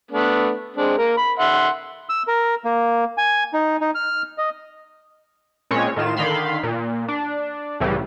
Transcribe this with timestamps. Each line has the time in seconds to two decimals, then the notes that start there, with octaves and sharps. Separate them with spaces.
0.11 A3 B3 D4
0.76 G#3 C4 D4
0.98 A#3 A#4
1.17 B5
1.39 E5 F#5 C6
2.09 E6
2.28 A#4
2.65 A#3
3.18 G#5
3.54 D#4
3.81 D#4
3.95 F6
4.38 D#5
5.71 A#2 G#3 C4 C#4 C#5
5.96 A2 D#3 F4 E7
6.17 D3 D#3 F5 B5 C6
6.63 A#2
7.08 D4
7.80 C2 A2 C#3 E3 G3